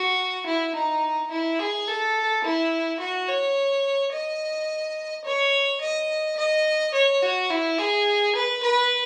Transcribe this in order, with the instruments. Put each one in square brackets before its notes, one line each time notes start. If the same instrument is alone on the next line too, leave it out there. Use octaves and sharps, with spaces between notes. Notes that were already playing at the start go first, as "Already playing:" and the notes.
Already playing: [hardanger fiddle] F#4
E4
D#4
E4
G#4
A4
E4
F#4
C#5
D#5
C#5
D#5
D#5
C#5
F#4
E4
G#4
B4
B4